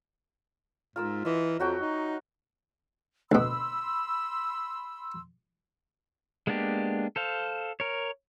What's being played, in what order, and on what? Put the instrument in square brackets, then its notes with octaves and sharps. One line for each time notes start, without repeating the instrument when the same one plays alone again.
[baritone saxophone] G#2 [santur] F4 A#4 E6
[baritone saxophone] E3 [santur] D#5 E5
[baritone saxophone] F2 [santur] F#3 F#4 G5
[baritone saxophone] D#4
[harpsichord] D2 B2 [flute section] B5 C6 E6
[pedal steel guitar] G#3 A#3 B3 D4 G4
A4 C5 F5
A#4 C#5